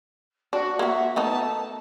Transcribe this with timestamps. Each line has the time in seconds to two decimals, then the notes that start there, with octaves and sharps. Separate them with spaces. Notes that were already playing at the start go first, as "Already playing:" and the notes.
0.53 D4 F#4
0.79 A#3 F#4 E5
1.16 A3 B3 D#4 A5